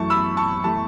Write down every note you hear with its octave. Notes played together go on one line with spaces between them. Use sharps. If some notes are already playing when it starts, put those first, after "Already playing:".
Already playing: F#2 E3 A3 A5 C#6
B5 E6
A5 C#6
E3 A3 A5